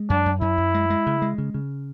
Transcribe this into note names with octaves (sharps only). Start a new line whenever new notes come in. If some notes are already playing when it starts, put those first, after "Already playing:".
Already playing: G#3
F#2 D4
F#2
F#2 E4
F#2
G#3
G#3
C#3
G#3
C#3
C#3